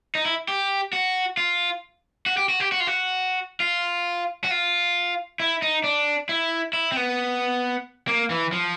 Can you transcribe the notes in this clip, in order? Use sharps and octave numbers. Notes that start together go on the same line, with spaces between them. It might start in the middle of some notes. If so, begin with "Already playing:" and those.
D#4
E4
G4
F#4
F4
F#4
G4
F#4
G4
F#4
F4
F#4
F4
F#4
F4
E4
D#4
D4
E4
E4
C4
B3
A#3
E3
F3